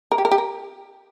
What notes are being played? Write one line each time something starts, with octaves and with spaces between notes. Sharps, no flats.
A#4
G4
A#4
G4
A#4